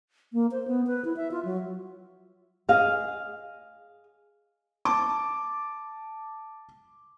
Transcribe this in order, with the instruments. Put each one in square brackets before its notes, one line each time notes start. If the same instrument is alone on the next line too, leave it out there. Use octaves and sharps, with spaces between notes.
[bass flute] A#3
C5
B3
B4
E4
E5
F4
F#3
[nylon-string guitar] G#4 D#5 F5
[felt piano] A5 D6